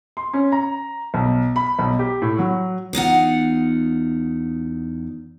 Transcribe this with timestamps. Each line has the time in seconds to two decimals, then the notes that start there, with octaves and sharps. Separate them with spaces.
0.17 C6
0.33 C#4
0.52 A#5
1.14 B1
1.56 B5
1.79 B1
1.99 G4
2.22 A2
2.39 F#3
2.93 E2 D#4 F4 F#5